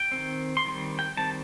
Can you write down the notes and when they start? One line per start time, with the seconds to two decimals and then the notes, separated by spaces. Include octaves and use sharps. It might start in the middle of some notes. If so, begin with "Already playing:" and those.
Already playing: G5
0.12 D#3 A3 C4
0.57 C6
0.65 D#3 G3 C4
0.99 G5
1.17 D#3 G3 C4 A5